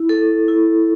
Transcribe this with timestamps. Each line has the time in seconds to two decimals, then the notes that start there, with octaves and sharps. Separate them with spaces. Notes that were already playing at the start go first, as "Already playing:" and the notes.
Already playing: E4
0.09 A4
0.48 E4